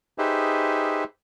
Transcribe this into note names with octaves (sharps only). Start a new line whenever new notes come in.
D#4 G4 G#4 B4 C5 E5